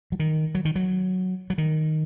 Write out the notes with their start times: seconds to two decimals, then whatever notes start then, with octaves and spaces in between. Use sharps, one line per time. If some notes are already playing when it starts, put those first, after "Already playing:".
0.12 F#3
0.19 D#3
0.55 F#3
0.65 D#3
0.76 F#3
1.50 F#3
1.58 D#3